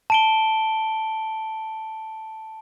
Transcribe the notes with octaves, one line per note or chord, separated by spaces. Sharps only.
A5 D7 G7